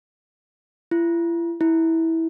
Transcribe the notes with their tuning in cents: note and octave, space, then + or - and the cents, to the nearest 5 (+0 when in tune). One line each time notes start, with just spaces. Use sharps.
E4 +40
E4 -15